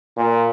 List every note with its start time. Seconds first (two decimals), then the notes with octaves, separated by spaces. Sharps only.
0.17 A#2